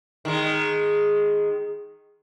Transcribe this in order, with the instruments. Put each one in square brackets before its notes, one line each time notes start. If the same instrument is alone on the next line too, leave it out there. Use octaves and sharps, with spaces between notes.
[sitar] D#3 G#3